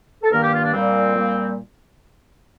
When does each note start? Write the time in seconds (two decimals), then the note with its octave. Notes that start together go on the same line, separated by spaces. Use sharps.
0.22 A4
0.31 G2 D#3 A#3 A#4
0.42 G4
0.52 F4
0.62 D4
0.73 A#2 G3 A#3 C4
1.15 A#2 G3 A#3